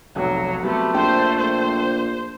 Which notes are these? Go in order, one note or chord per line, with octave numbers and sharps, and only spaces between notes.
F1 B1 F#3
C3 F#3 G3 A3 B3
A#1 C5 G5
C5